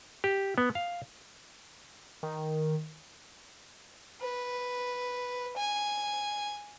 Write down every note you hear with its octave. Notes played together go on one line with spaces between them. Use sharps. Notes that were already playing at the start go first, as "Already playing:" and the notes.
G4
B3
F5
D#3
B4
G#5